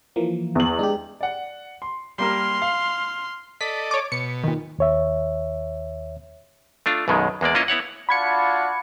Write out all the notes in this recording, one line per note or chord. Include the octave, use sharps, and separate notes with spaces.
E3 F3 A#3
E2 F#7
G#3 D4 G4
D5 F#5
C6
G3 A#3 A#4 C6 F6
F5
A4 D5 D#5 B6
C#5 D6
B2 C#7
A#2 D#3
D#2 C#5 E5
A3 D4 F4
B1 F#2 B2 D#3 G#3
E2 G#3 A#3 D5
A#3 C#4 E4 F4 D#5
B3 E4 C#5 F#5
D4 F4 F#4 B5 G#6 C#7